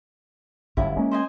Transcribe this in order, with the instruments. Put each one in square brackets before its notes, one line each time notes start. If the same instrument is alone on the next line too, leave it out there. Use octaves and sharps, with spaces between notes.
[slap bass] G1 F#2 A2 [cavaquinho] E4
[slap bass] G#3 A#3 C#4
[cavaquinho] C5 D#5 G#5